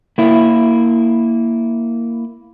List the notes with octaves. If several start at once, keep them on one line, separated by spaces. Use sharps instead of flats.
A#3 E4